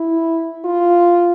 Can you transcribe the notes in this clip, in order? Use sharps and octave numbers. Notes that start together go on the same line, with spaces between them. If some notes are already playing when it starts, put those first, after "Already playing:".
Already playing: E4
F4